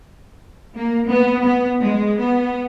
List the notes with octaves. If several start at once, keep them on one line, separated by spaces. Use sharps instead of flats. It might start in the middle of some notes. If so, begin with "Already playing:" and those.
A#3
B3
B3
G#3
B3